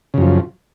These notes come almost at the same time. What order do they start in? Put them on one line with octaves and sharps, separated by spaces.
C#3 F#2 F3